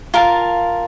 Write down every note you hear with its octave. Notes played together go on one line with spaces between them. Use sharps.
F4 A#4 F5 A5